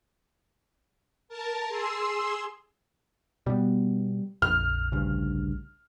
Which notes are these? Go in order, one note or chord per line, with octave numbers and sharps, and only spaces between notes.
A#4 A5
G#4 C6 E6
B2 G3 B3
A#1 F2 F6
D2 G2 C#3